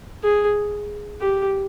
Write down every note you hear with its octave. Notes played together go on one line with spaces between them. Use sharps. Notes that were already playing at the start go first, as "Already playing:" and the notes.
G#4
G4